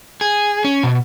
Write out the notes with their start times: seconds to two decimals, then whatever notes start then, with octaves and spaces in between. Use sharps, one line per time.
0.21 G#4
0.65 C#4
0.83 B2